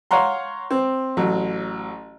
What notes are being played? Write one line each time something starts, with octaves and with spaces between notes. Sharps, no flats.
C#5 F5 F#5 A#5 C6
C4
A1 F#3